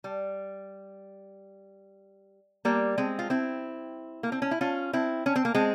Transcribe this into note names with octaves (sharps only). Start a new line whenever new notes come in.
G3
G3 A#3
G#3 C4
F4
C4 E4
A#3
C4
C#4
E4
C#4 F4
C4 E4
C#4
C4
A#3
G#3 C4